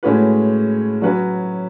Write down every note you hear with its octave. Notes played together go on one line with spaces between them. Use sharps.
A2 G#3 C#4 F#4 B4
F#3 C#4 F#4 B4